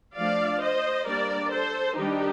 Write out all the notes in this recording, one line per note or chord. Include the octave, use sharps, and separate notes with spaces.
F3 A3 D4 D5 F5
C5 D#5
G3 A#3 D4 A#4 D5
A4 C5
D#3 G3 D4 D#4 G4